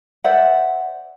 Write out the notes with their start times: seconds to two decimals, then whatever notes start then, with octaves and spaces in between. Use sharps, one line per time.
0.24 C5 D5 E5 F#5